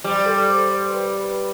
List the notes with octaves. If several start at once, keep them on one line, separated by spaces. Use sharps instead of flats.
G3 C5
A4
C5
C5
B4